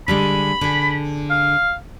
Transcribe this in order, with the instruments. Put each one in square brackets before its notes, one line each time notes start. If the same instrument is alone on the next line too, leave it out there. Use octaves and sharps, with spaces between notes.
[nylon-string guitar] D3 G3 G#3 [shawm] B5
[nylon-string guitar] D3 G#4
[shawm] F5